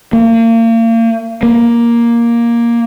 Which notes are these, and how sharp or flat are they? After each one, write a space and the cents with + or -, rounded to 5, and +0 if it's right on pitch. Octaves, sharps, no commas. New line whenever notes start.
A#3 -35
A#3 +10